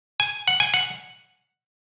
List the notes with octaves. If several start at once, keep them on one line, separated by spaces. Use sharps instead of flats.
G#5
F#5
G#5
F#5